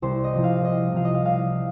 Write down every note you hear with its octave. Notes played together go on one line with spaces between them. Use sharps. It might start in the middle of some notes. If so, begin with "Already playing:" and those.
C2 C5
D#5
C3 F3 C4
F5
C2 D#5
C3 F3 C4 F5
D#5
F5
C2 F5